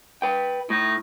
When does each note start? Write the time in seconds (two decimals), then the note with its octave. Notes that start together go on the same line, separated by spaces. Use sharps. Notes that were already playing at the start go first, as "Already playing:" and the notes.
0.22 B4 G5
0.70 A2 D#4